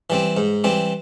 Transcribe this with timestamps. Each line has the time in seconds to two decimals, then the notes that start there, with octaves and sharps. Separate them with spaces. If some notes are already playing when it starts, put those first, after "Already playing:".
0.10 E3 G3 C4
0.37 G#2
0.64 E3 G3 C4